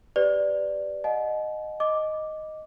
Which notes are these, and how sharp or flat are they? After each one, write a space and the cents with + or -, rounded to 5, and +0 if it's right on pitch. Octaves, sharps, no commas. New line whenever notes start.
G4 +0 B4 +20 D5 +0
D#5 -15 F#5 -40 A5 -45
D#5 +0 D6 +0